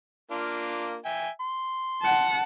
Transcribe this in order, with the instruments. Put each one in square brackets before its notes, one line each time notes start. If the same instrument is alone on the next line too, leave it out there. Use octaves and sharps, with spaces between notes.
[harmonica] A#3 D4 F4
E5 G5 G#5
C6
[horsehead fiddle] F#5 A5